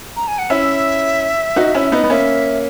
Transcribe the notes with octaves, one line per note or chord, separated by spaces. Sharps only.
A#5
G#5
F#5
C#4 E4 E5
D#4 F#4
C#4 E4
B3 D#4
B3
A#3 C#4 E5